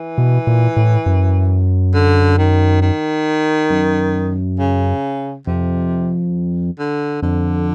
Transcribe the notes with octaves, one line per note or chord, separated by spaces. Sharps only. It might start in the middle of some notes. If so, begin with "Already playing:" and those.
Already playing: E3
B2
A#2
A2
F#2
D3
D#3
D#3
F#2
C#3
F2 C3
D3
F2 D3